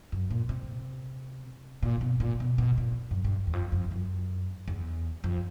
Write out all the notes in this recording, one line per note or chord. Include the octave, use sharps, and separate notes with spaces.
F#2
A#2
C3
A#2
B2
A#2
B2
B2
A#2
F#2
G2
E2
F2
F2
F#2
E2
F2